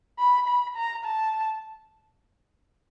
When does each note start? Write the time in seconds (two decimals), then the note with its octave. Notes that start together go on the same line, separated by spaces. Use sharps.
0.19 B5
0.47 B5
0.76 A#5
1.04 A5